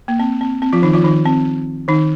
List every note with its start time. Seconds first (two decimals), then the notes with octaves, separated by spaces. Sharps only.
0.08 A#3
0.20 C4
0.41 C4
0.62 C4
0.73 F3 F4
0.82 D#3 D#4
0.93 F3 F4
1.04 D#3 D#4
1.25 C4
1.88 D#3 D#4